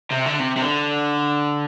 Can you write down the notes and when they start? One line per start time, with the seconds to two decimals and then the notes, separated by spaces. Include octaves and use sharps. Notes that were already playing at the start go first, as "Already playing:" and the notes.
0.11 C3
0.26 D3
0.40 C3
0.57 C3
0.62 D3